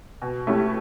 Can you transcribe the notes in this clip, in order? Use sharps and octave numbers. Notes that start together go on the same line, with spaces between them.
B2
A3 C#4 E4 G4